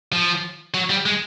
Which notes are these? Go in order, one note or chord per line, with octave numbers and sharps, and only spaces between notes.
F3
F#3
G3
G#3